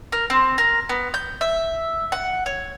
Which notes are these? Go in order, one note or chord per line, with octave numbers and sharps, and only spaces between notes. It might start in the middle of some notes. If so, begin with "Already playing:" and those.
A#4
C4
A#4
B3
G6
E5
F#5
C#5